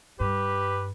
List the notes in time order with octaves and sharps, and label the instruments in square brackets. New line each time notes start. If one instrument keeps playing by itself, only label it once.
[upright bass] G2 [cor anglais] G4 [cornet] B4